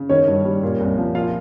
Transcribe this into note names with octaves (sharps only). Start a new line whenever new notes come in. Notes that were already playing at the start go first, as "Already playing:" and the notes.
Already playing: C#3
D#3 C#4 C#5
G2
G3
A#2
C2
F3
A#2 F4 F5